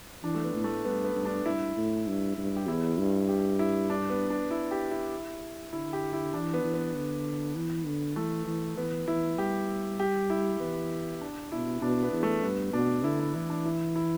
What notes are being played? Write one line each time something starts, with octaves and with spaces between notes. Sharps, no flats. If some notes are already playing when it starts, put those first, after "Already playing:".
E3 D4
A3
B3
A2
A3
G2 B3
B3
G2
D4
G2 E4
A2
G2
G2
G4
E2 E4
G2
G4
E4
D4
B3
D4
E4
G4
E4
D3 E4
G4
E4
E3 D4
B3
E3
B3
D3
E3
D3
E3 A3
E3
E3 B3
E3 E4
G3 G4
G4
E4
E3 B3
D4
B2 E4
B2 D4
B3
E2
A3
G2 B3
B2 D4
D3 E4
E4
E3 E4
D4
E4
E4